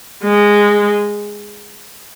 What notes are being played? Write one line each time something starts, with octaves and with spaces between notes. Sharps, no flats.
G#3